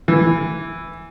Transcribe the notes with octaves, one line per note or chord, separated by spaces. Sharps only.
E3